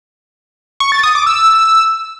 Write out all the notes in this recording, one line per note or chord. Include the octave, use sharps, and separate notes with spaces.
C#6
A6
D#6
D6
E6